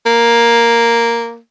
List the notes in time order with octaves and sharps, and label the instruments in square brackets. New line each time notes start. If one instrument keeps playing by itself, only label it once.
[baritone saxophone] A#3